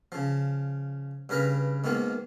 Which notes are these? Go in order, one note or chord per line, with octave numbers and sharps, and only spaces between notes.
C#3 F3
G2 C#3 A#4 B4 A#5 B5
G#2 B2 D#3 A#3 F4